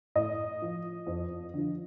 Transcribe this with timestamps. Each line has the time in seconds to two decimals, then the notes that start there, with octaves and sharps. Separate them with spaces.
0.15 A2 D#5
0.62 F3
1.07 F2
1.54 D3 F3